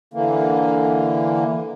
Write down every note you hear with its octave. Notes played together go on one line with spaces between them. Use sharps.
D3 E3 A#3